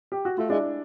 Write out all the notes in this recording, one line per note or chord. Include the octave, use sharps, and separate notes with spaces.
G4
F#4
A3 F4
G#3 D4 E4